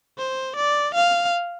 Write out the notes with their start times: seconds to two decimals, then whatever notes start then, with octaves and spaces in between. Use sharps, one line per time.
0.18 C5
0.57 D5
0.95 F5